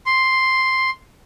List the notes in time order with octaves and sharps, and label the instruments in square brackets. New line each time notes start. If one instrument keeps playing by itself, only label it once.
[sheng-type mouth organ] C6